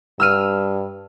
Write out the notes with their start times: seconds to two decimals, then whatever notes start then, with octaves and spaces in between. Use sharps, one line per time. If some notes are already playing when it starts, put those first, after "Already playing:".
0.20 G2 E6 F6 D#7